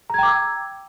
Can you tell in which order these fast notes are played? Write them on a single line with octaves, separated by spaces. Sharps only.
A#5 G#6 G5 D6 E6